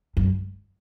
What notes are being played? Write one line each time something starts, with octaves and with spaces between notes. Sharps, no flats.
F#2